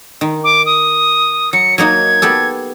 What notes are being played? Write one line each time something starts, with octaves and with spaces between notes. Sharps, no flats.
D#3
D6
D#6
F#3 C#7
F#3 A#3 D#4 G#6
B3 G4 A4